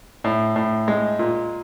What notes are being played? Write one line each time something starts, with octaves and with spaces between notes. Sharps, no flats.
A2
A2
G#3
A#2